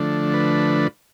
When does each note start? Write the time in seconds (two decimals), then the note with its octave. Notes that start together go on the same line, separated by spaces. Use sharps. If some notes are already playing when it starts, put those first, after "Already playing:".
Already playing: D3 F3 A3 D4
0.34 B4